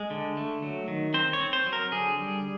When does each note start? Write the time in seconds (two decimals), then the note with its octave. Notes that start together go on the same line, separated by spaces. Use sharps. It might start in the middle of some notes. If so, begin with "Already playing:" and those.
Already playing: G#3
0.10 D3
0.37 A3
0.63 F#3
0.88 D#3
1.14 C4 C5
1.33 C#5
1.40 C4
1.53 C5
1.66 F#3
1.73 A#4
1.91 D3 G#4
2.18 G3